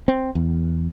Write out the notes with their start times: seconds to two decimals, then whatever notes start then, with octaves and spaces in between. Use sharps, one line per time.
0.08 C4
0.35 E2